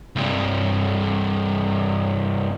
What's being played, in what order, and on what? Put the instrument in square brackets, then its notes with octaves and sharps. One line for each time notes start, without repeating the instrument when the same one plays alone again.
[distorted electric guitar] C2 G2